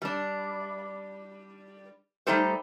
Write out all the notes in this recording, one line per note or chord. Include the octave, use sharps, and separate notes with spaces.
G3 D4
G3 A3 D#4 G4 A4 C5